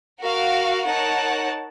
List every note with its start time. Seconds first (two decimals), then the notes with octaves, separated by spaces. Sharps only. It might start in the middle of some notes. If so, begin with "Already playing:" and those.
0.21 F#4 A#4 F5
0.85 D#4 A#4 C#5 F#5 A5